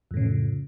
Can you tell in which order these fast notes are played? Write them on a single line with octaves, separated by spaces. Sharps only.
F2 A2 C#3